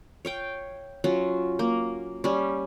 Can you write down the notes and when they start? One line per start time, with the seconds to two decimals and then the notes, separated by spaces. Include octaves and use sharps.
0.25 C#5 F5 G5
1.04 F#3 C#4 F4
1.59 A#3
2.24 G3 C#4